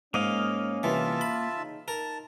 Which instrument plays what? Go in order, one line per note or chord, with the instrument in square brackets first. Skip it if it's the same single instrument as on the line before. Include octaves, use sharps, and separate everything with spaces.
[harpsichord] G#2 [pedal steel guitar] A#3 D#5 F5 [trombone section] C#4
[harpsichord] C2 E3 [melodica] F4 E5 A5
[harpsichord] B5
[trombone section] C#3 D#4
[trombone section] D#4 [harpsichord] A#4 [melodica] A5